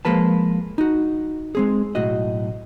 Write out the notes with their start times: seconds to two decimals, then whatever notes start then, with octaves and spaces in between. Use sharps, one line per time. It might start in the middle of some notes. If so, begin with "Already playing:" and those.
0.05 F3 G#3 A#3 B4 A5
0.78 D#4 F#4
1.55 G#3 C4 G#4
1.95 B1 A2 F#4 D#5